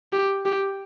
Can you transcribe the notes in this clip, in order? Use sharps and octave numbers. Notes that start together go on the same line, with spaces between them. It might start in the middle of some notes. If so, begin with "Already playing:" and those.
G4
G4